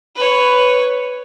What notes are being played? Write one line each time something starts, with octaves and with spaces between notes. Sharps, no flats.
B4 C#5